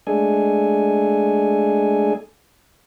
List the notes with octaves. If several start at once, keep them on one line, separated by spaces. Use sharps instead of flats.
G#3 A3 D4 G#4 A4 G#5